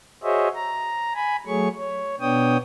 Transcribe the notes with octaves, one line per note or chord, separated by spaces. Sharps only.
F#4 G#4 C5 C#5 D#5 E5
A#5
G#5 B5
F#3 A3 G#4 C#5 C#6
C#5
B2 B3 D4 C#5 G5 D#6